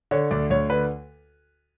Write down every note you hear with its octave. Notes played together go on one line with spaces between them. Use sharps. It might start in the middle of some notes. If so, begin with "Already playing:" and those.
D3 C#5
D2 D5
D2 C#5
D3 B4